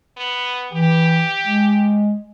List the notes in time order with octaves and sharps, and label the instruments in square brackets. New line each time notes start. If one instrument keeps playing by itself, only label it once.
[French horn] B3
[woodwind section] E3 [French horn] G4
[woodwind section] G#3